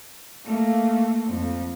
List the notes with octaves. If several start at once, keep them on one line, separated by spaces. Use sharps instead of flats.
A3 A#3
F2